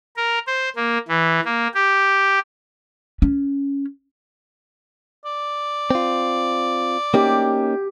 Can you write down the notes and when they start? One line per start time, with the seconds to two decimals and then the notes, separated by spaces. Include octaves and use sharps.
0.16 A#4
0.47 C5
0.76 A#3
1.08 E3
1.45 A#3
1.74 G4
3.22 C#4
5.25 D5
5.91 C4 F4
7.14 A#3 C#4 D#4 G4